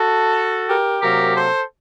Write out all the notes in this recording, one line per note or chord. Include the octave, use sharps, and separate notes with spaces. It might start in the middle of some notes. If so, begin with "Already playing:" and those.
Already playing: F#4 A4
G4 A#4
C3 F#3 A#3 G4 A#4
A4 C5